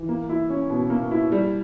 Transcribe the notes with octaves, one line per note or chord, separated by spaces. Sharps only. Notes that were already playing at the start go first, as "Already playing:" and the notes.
Already playing: E3
A#3
E4
C#4
B2
A#3
E4
G3